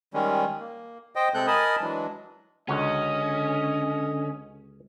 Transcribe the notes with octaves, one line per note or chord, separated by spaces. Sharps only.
D#3 G3 G#3 C#4
A#3
C5 D#5 G5
C3 G#3 C4 A4 F#6 G6
A#4 D#5 G#5 A5 B5 D#6
E3 F#3 G#3 D4
C#2 D3 C#4 F#4 D#5